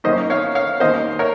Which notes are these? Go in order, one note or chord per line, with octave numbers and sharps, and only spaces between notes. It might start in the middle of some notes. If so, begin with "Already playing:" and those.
F#2 D#3 A#3 C#4 C5 D#5
C#5 F5
C#5 F5
D#2 D#3 A#3 C#4 C5 D#5
A#4 C#5